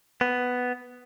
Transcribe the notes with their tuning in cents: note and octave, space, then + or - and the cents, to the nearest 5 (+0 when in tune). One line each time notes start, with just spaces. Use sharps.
B3 +5